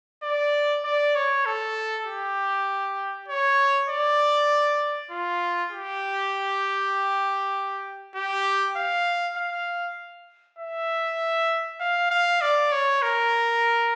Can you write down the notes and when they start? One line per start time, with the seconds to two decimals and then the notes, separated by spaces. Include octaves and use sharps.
0.24 D5
0.85 D5
1.16 C#5
1.45 A4
2.06 G4
3.28 C#5
3.90 D5
5.11 F4
5.72 G4
8.15 G4
8.77 F5
9.37 F5
10.59 E5
11.80 F5
12.11 F5
12.41 D5
12.72 C#5
13.02 A#4